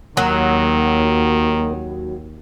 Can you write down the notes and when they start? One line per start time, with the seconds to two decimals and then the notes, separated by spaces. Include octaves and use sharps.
0.17 D#2 D#3 F#3 A#3